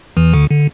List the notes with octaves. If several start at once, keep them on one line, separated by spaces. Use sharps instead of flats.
E2 E3
D2 D3
D3